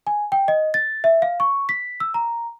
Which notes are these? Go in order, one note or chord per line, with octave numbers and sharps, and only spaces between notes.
G#5
G5
D#5
A6
E5
F5
C#6
B6
E6
A#5